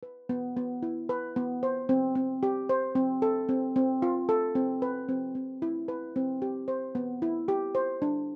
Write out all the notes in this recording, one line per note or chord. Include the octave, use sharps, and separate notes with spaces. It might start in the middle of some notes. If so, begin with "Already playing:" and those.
B4
B3
B3
E4
B4
B3
C5
C4
C4
G4
C5
C4
A4
C4
C4
F4
A4
C4
B4
C4
C4
E4
B4
C4
G4
C5
B3
E4
G4
C5
D4